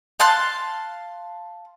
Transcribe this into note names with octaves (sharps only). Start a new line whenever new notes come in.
F5 A5 C6 F#6